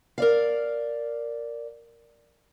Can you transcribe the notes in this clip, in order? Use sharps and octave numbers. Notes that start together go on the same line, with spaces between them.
A#4 D5 F5